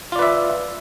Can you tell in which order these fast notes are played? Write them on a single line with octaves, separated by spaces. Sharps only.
F4 D5 B4 E5